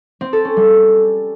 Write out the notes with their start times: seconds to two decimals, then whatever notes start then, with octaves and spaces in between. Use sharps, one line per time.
0.21 C4
0.33 A4
0.45 C#4
0.57 G3